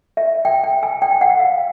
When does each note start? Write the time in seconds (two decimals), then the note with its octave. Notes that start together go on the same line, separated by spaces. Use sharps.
0.17 E5
0.45 G5
0.64 G5
0.83 G#5
1.02 G5
1.21 F#5
1.39 F5